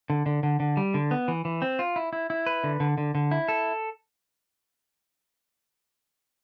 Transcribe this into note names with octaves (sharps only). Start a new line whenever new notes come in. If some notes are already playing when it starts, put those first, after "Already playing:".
D3
D3
D3
D3
G3
D3
B3
E3
E3
C4
F4
E4
E4
E4
B4
D3
D3
D3
D3
E4
A4